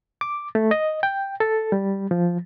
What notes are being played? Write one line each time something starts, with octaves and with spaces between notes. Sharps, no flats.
D6
A3
D#5
G5
A4
G3
F3